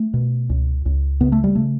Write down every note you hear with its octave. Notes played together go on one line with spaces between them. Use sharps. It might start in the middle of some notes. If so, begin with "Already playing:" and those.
Already playing: A3
B2
C#2
C#2
C#3 B3
A3
G3
C#3 A3